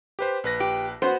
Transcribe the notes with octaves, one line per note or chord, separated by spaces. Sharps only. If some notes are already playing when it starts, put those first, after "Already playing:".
G4 B4 C5
A#1 B4 A#6
G4
B3 F#4 C5